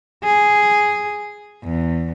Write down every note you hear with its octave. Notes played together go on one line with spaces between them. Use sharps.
G#4
E2